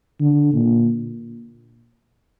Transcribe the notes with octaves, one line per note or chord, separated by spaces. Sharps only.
D3
A#2